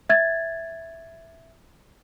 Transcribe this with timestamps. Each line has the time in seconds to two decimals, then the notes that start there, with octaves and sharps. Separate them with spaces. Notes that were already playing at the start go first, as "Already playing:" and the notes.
0.09 E5 G#6 A6